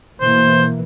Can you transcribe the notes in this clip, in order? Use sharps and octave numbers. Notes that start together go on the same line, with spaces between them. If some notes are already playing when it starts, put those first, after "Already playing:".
B2 E3 A#3 C5